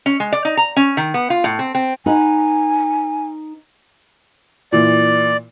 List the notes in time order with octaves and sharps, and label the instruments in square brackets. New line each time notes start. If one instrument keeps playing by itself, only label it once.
[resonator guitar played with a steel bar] C#4
G#3
D5
D#4
A#5
C#4
D#3
B3
F4
A2
C4
C4
[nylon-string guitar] D#4 B4 F#5 [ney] G#5
[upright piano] A#2 E3 [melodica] D5